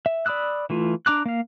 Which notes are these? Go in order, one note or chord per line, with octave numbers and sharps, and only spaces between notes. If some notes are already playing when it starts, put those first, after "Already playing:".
E5
D5 B5 D#6 E6 F#6
E3 A3 F4
D4 A#5 D6 F#6
A#3 F5